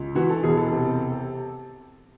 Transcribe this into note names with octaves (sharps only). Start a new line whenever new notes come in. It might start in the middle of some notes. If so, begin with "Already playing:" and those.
Already playing: C#2
E3 F#4
A4
E1 G#4
A4
C3